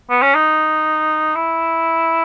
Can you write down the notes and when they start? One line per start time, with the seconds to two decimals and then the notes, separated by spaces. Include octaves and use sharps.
0.10 B3
0.22 C#4
0.35 D#4
1.35 E4